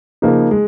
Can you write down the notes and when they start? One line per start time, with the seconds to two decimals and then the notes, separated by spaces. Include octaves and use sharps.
0.22 C#3 F3 A#3 D#4
0.51 G#3